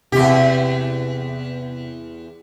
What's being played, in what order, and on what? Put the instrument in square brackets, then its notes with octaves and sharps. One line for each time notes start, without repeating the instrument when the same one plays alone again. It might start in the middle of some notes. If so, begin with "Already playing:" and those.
[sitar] E2 G4 [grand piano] C3